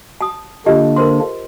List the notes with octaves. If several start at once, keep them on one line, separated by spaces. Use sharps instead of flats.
A5 D#6
D3 A#3 D4 F4 G4 D#5
A#4 C5 C6